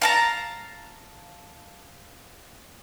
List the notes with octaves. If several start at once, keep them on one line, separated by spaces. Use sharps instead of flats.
F5 A5 A#5